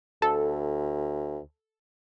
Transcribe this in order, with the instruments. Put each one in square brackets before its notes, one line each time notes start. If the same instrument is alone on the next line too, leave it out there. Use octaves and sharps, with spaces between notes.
[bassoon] D2 [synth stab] A4